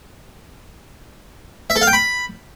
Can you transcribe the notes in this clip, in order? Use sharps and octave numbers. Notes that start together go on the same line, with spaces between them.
E5
A4
F5
G5
B5